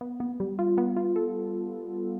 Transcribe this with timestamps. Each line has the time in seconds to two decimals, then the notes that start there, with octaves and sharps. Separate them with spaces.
0.01 B3
0.20 B3
0.40 G3
0.59 F4
0.78 B3
0.96 F4
1.16 A4